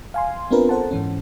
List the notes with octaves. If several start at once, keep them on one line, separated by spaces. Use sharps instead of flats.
F5 G#5 C6
B3 C4 D4 F4 A#4 B4
A4 C5 F#5 A5
G#2 E3 C#4